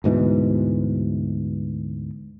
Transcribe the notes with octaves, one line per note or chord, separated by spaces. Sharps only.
D2 G#2 B2 E3